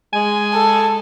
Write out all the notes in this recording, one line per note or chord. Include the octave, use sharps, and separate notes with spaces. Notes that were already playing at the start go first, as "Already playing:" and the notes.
G#3 G#5
A4